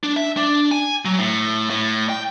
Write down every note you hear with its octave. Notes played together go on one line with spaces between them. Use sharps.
D4
E5
D4
G#5
F#3
A2
A2
G5